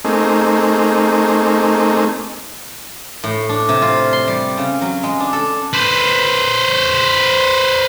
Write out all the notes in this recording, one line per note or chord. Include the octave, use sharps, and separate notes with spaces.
A3 A#3 C4 D#4 G#4
A2
D4
C3
F4
C6
G3
C#3
F#3
G#3
D4
A4
B4 C5